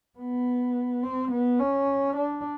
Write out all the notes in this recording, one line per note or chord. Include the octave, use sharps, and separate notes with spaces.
B3
C4
B3
C#4
D4